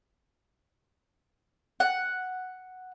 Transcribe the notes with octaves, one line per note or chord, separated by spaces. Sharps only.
F#5